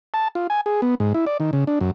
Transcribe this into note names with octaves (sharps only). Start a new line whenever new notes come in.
A5
F4
G#5
G#4
B3
G#2
E4
D5
D#3
C#3
D4
F#2